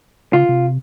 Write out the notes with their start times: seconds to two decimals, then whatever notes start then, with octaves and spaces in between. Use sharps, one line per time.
0.33 C#3 F4
0.49 C3